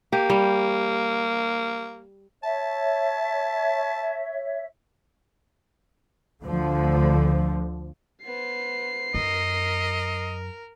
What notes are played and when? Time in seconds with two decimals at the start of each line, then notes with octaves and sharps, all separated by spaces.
0.13 A#3 G4
0.30 G3
2.43 C#5 E5 A5
6.44 D2 D3 F3
8.25 B3 C5 C7
9.14 F#2 A#4 D#5